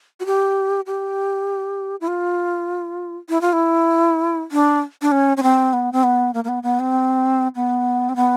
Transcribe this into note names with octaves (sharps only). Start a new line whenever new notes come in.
F#4
G4
G4
E4
F4
E4
F4
E4
D4
D4
C#4
C#4
C4
B3
C4
B3
A#3
A#3
B3
B3
C4
B3
C4
B3